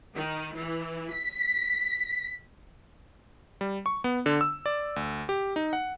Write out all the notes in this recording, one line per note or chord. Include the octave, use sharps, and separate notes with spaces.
D#3
E3
B6
G3
C#6
B3
D3
E6
D5
D2
G4
D#4
F#5